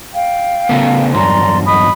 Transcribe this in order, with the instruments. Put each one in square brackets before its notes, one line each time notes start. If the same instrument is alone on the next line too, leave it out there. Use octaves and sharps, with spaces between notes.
[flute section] F5 G5
[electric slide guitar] C#3 A3 B3
[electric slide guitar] E2 G2 F#3 [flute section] D5 A#5 C6
[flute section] D#5 B5 D#6